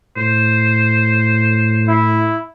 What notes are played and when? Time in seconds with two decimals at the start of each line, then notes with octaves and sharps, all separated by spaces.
0.17 A2 C5
1.88 E4